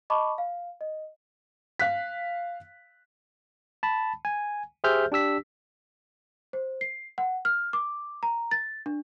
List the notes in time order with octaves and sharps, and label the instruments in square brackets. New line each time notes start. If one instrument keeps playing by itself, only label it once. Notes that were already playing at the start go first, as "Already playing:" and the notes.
[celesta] D#5 A5 B5 C#6 D6
F5
D#5
[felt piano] F5 F#6 B6
[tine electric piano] A5 B5
G#5
G4 G#4 C5 E5 F6 G6
D4 G4 E6 B6
[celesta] C5
C7
F#5
F6
D6
A#5
A6
D4